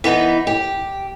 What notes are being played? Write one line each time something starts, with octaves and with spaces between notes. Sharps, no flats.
E3 B3 D#4 B4
G4